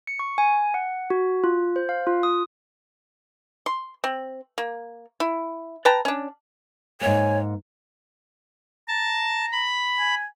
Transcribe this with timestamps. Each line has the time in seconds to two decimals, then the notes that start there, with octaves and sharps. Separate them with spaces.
0.07 C#7
0.19 C#6
0.38 G#5
0.74 F#5
1.10 F#4
1.44 F4
1.76 C5
1.89 F5
2.07 F4
2.23 D#6
3.66 C6
4.04 C4
4.58 A#3
5.20 E4
5.85 B4 G5 A5 A#5
6.05 C#4 D4
7.01 G#2 A#3 C#5 G#5
8.88 A5 A#5
9.52 B5
9.99 G#5